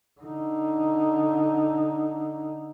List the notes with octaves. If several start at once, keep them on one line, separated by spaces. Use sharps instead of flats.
D3 D#4